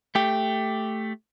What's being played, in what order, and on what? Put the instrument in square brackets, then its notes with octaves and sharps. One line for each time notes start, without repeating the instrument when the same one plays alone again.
[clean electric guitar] A3 G4